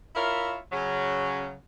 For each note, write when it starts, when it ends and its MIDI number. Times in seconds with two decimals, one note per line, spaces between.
0.15 0.57 64
0.15 0.57 65
0.15 0.57 70
0.15 0.57 73
0.15 0.57 76
0.15 0.57 77
0.72 1.54 49
0.72 1.54 54
0.72 1.54 61